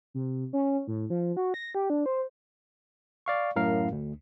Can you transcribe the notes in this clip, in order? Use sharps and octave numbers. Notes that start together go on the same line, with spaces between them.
C3
C#4
A2
F3
F#4
A#6
G4
D4
C5
D5 F5 C#6
F#2 A2 A#4 F5
D2